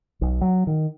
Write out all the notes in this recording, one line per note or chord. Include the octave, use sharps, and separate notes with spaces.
B1
F#3
D#3